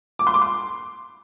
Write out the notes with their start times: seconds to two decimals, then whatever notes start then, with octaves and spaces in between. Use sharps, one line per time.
0.19 D6
0.27 C6
0.34 D6
0.42 C6